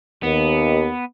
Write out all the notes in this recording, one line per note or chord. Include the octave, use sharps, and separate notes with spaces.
D#2 B3